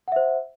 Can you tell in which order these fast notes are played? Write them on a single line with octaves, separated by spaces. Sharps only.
F#5 E5 C5